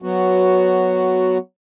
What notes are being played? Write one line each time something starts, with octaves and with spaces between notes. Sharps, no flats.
F#3 B3 F#4